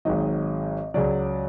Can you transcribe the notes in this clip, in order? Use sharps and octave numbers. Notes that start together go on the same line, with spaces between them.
G#1 G#2 D#3 F#3 D#5
C#2 C#3 F#3 D5